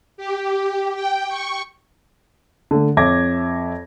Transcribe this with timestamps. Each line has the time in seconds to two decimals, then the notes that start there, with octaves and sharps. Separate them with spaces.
0.17 G4
0.95 G5
1.28 C#6
2.71 D3 A3
2.97 F2 C#5 E5 D6 G#6 A#6